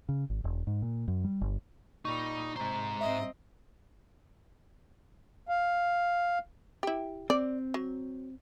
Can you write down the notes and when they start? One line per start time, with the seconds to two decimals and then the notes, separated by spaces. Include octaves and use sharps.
0.09 C#3
0.30 G#1
0.44 E1
0.67 G#2
0.82 A#2
1.08 F#2
1.24 G3
1.41 G1
2.05 A#2 G3 D#4 C#6
2.56 G#2 C3 C5 A#5
3.01 C4 D#5 E5
5.49 F5
6.83 E4 G4
7.30 C4 D5
7.74 F#3